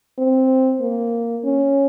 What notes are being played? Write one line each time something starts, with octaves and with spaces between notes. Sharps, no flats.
C4
A#3
C#4